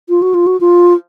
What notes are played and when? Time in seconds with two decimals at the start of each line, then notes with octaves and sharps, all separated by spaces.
0.09 F4
0.22 F#4
0.34 F4
0.47 F#4
0.61 F4